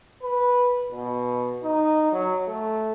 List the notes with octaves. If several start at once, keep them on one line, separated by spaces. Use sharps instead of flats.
B4
B2
D#4
F#3
A3